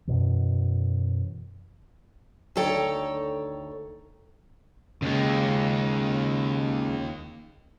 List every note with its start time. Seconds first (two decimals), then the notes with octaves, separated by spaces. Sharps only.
0.07 F#2 B2 E3
2.56 D2 D#3 A4 C#5 G5 A#5
5.02 D#2 C#3 G#3